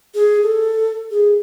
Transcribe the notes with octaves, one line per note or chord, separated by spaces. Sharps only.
G#4
A4
G#4